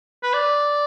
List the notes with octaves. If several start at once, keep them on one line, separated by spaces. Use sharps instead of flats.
B4
D5